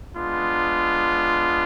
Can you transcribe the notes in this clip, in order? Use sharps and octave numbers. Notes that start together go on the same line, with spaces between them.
G#3 B3 D4 F4